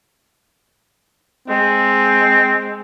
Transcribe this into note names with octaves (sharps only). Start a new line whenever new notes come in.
G#3 C4